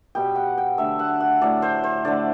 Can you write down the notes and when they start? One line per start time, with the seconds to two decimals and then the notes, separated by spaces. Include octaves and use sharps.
0.15 B2 G3 G5
0.36 F#5
0.58 G5
0.78 D3 F#3 A3 E5
0.99 F#5
1.20 F#5
1.42 A2 F#3 A3 D5
1.62 C5
1.84 C5
2.05 D3 A3 D5